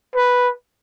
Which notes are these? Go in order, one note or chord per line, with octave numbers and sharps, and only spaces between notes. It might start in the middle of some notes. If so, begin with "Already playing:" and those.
B4